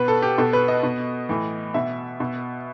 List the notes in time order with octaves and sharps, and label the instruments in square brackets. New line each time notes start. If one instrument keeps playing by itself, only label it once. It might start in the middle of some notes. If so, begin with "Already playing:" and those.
Already playing: [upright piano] B2 B4
A4
G4
B2 A4
B4
D#5
B2
A2 E3
B2 E5
B2